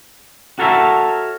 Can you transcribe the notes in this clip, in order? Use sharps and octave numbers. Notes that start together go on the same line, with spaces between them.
F#4 A4 A#4 C#5 E5